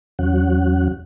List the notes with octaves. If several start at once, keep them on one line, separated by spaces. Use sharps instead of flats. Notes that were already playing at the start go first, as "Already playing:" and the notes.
E2 F#3 C#4 F#5